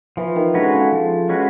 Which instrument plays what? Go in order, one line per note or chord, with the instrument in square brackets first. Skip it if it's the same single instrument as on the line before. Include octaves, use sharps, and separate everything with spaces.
[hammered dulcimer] E3 [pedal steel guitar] F3
[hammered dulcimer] D#3
[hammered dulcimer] D3 [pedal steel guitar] G#3 C#4 F#4 B4
[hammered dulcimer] C#3
[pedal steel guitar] F3
G#3 C#4 F#4 B4